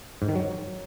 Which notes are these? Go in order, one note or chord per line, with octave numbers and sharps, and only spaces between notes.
G#2
D#3
F#3